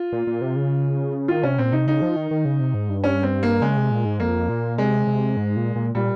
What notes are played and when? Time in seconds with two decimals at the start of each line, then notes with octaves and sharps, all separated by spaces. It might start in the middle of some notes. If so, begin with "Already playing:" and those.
Already playing: F4
0.13 A#2
0.27 A#2
0.42 C3
0.56 C#3
1.28 D#3 F4
1.43 C3 C#4
1.58 A#2 C4
1.72 C3 D#4
1.87 C#3 D#4
2.02 F3
2.16 D#3
2.31 D#3
2.45 C#3
2.60 C3
2.74 G#2
2.89 G2
3.04 C#4
3.23 C4
3.43 A#3
3.62 C#3 G#3
3.77 C3
3.91 A#2
4.05 G#2
4.20 F2 A#3
4.49 A#2
4.78 C3 G#3
5.07 C3
5.37 G#2
5.56 A#2
5.76 A#2
5.95 A#2 G3